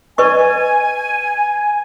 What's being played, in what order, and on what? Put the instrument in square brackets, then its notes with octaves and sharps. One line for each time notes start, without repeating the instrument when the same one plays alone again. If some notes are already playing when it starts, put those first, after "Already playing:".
[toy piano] B4 D#5 C#6 [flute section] G#5